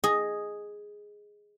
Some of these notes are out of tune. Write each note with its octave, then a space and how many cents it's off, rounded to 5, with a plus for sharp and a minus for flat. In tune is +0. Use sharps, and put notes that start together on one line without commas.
G#4 +0 D#5 +0